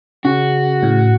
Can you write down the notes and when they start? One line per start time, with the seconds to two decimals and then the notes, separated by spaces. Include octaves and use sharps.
0.25 C#3 C#4 F#4
0.83 A2